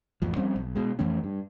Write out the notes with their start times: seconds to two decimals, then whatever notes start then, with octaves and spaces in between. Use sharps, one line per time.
0.22 A1 F2 F3
0.36 F3 G3 C4 C#4
0.56 B1
0.75 B2 G#3
0.99 F2 E3 A3 C#4
1.24 G2